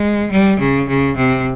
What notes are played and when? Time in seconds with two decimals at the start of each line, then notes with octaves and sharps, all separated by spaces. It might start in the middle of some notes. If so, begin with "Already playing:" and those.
Already playing: G#3
0.31 G3
0.59 C#3
0.89 C#3
1.16 C3